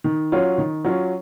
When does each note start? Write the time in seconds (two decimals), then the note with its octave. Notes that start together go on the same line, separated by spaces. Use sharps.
0.04 D#3
0.32 F#3 C#4 F4
0.58 D#3
0.85 F#3 C#4 F4